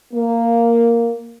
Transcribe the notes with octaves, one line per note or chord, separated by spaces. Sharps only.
A#3